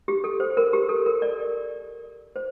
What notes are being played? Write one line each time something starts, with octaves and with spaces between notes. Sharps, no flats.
G4
A4
C5
A#4
G4
A4
A#4
D5
C5